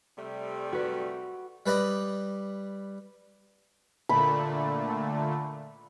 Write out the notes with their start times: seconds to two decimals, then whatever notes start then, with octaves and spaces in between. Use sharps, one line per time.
0.18 C3 G3 A3
0.72 F#4 B4
1.66 G3 B4 D5 D#5
4.09 A#2 D3 A3 B5